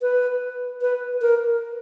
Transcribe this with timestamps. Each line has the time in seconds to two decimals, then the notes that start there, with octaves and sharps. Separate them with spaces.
0.02 B4
0.81 B4
1.21 A#4